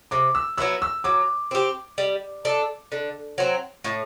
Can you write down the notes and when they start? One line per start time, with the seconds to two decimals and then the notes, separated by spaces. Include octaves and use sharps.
0.11 C3 D6
0.35 E6
0.57 F#3 B3 E4 E6
0.82 E6
1.04 F#3 D6
1.51 C4 G4
1.98 G3
2.45 D4 A4
2.92 D3
3.38 F#3 C4
3.84 A2